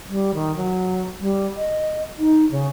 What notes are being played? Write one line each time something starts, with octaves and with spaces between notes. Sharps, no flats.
G3
D#3
F#3
G3
D#5
D#4
C#3